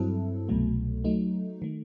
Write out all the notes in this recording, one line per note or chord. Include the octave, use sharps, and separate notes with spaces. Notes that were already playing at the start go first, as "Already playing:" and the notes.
Already playing: G2 F#3 C4 E4 A4
C2 B2 F#3 A3
F#3 A3 D#4
D#3 A3